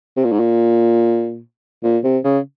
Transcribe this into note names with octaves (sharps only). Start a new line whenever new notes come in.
C3
A#2
G#2
A#2
A#2
C3
C#3